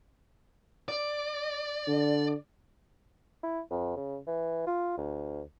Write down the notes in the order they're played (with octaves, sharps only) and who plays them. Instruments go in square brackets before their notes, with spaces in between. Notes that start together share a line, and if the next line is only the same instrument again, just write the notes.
[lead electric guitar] D5
[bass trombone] D3
[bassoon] E4
F2
C#3
E3
F4
D2